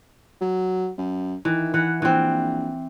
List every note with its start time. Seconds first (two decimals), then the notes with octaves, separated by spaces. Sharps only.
0.41 F#3
0.98 F#2
1.45 D#3 E3
1.74 E3 F#5
2.02 A#1 E3 C4